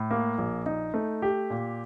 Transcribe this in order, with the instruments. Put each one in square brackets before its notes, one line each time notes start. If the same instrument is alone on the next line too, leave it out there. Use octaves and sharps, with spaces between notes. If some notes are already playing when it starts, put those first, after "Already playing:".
Already playing: [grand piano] A2
A#3
A#1
D#4
A3
G4
A#2